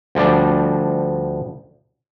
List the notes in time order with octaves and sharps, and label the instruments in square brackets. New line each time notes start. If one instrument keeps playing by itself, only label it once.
[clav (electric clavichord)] D2 F3 G3 D4